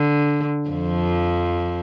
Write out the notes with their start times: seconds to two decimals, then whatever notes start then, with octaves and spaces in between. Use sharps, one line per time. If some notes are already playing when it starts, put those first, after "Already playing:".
Already playing: D3
0.70 F2 F3